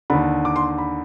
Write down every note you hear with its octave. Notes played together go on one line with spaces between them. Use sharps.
D#2 D3 B5
D6
C6
B5